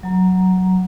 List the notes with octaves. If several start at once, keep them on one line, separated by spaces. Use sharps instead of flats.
F#3 A#5